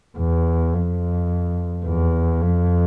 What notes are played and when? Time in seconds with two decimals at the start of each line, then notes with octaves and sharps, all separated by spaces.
0.18 E2
0.74 F2
1.86 E2
2.41 F2